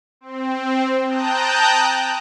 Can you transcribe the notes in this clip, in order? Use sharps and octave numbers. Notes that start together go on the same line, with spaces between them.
C4
G5 A5 A#5 D#6 F#6 G6